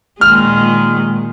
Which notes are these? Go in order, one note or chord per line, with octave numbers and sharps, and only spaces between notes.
A#2 D#3 G#3 F6